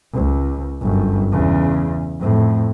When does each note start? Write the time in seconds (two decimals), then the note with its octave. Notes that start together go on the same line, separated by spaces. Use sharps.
0.14 C#2
0.82 G1 F#2
1.32 E2 C#3
2.20 F2 A2